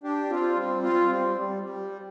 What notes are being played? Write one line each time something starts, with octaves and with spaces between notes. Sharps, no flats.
D4 G4
C4 F4
G3 C4
C4 F4
G3 C4
G3
G3